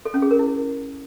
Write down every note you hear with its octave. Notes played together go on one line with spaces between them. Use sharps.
A4
C#4
G#4
A#4
E4